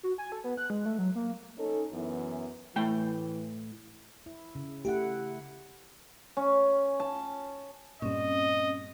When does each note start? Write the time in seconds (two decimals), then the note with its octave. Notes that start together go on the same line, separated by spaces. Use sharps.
0.03 F#4
0.18 G#5
0.32 A4
0.44 B3
0.57 F#6
0.70 G#3
0.85 A3
0.98 F#3
1.15 A#3
1.58 C#4 D#4 A4
1.92 F#2 E3 B3
2.76 A2 E3 A3 G5
4.26 E4
4.55 C#3
4.85 A3 E4 G4 F#5
6.37 C#4
7.00 A5
8.02 G2 A#2 C4 C#4 D#5